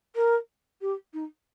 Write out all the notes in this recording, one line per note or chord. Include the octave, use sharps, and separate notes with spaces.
A#4
G4
D#4